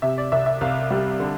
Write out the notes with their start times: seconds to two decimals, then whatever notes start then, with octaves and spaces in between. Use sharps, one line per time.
0.02 C3 E5
0.18 D5
0.32 C2 E5
0.46 E5
0.61 C2 F5
0.91 G3
1.20 D3